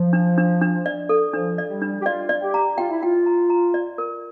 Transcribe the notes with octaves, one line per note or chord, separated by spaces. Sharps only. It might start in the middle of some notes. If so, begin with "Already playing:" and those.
Already playing: F3
D4
D4
D4
D5
A4
F3 D4
D5
G3
D4
G4
F4 D5
D5
G4
A#5
F4 G5
E4
F4 G5
A#5
A#5
D5
A#4